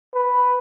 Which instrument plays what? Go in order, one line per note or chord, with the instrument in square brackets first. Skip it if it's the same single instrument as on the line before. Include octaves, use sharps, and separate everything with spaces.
[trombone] B4